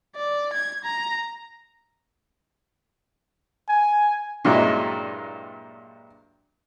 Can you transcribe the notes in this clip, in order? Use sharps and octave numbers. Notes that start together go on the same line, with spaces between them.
D5
G#6
A#5
G#5
G2 A#2 F#3 G#3 E4